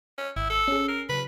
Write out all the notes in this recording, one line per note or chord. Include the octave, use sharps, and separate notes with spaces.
C#4
G#1 E4
A4
C#4 G#4
A#4 C7
C#3 F#3 B4